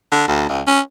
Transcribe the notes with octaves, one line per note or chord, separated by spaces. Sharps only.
D3
D2
C#2
C#4